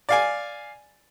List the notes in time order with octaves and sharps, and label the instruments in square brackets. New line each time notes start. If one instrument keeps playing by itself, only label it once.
[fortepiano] D5 F5 G#5